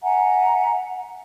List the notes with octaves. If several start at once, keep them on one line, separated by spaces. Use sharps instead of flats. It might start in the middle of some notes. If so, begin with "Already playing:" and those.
E5 F#5 G#5 A#5